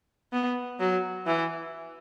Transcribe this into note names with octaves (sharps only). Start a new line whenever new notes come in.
B3
F#3
E3